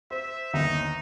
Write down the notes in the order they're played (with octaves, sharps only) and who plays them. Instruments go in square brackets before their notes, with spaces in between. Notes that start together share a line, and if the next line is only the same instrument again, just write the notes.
[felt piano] C5 [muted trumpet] E5
[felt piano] G1 D#2 E5 [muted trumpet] D#4